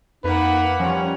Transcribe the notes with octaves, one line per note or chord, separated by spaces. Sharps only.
F2 A#3 D#4 B4 F#5
F3 G3 C#4 F4 A#5